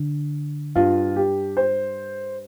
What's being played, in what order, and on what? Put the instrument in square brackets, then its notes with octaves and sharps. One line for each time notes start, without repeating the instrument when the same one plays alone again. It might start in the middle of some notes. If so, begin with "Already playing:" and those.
Already playing: [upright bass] D3
[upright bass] G2 [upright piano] F4
[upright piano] G4
C5